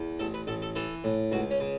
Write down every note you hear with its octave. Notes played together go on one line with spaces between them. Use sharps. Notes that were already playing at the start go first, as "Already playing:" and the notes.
Already playing: E2
A1 A4
B4
A1 A4
A4
E3 A4
A2
C#2 F#4
C#4
C#3